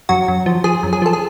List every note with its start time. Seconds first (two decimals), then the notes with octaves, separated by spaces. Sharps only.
0.09 F#2 F#4
0.28 F#2
0.46 F3
0.64 F3 G#4
0.83 F#2
0.93 G#4
1.02 F3 A4
1.13 G#4